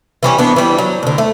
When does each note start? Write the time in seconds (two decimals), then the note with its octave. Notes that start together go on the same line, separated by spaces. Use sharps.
0.23 E3 G3 C#4
0.38 E3 B3 D4
0.56 E3 G3
0.78 F#3
1.03 D2 D3
1.18 A3